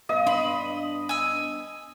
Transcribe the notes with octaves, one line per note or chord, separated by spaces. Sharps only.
G2 B3 D#5 F5
D4 B5 C6
G#5 E6